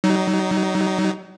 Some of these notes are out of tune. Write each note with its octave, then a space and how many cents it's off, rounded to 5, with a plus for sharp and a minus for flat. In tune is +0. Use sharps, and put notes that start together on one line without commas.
F#3 +35 D#4 +0